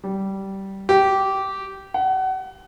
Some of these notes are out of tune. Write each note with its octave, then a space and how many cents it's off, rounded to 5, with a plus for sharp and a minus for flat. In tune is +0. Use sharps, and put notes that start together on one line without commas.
G3 -15
G4 -15
F#5 +30